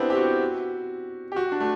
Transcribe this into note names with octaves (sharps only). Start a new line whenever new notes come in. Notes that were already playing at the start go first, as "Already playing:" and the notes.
Already playing: B3 C4 D4 E4 G4
G4
F#4
G4
F#4
D4
A3